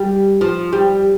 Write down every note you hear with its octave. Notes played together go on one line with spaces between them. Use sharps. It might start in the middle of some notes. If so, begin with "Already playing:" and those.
Already playing: G3
F3
G3